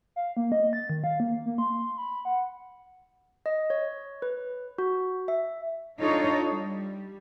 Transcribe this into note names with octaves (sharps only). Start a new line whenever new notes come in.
F5
A#3
D#5
A6
D#3
F5
A#3
A#3
C6
B5
F#5
D#5
C#5
B4
F#4
E5
D4 D#4 F4 A4 C#5
G3